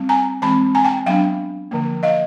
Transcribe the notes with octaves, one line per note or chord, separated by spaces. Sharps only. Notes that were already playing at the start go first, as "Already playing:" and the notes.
Already playing: G3 C4
G#5 A#5
E3 G#3 C4 A5 B5
G#5 A#5
G5 A5
F#3 B3 D4 F5 G5
D3 F3 A#3
D#5 F5